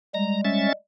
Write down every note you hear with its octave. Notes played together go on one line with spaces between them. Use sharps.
G3 G#3 A#5
C#4 E5 A6